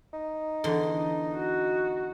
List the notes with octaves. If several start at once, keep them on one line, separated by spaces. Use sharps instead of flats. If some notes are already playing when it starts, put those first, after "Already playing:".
D#4
E2 D3 C6
F#4